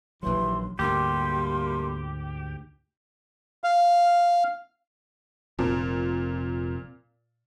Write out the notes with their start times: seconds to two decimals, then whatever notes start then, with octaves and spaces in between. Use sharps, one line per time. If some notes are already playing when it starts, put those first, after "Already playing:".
0.23 A#1 D#2 E3 F#3 C6
0.79 D2 G#2 G3 A3 A#3 G4 C6
3.64 F5
5.59 F1 A#2 C4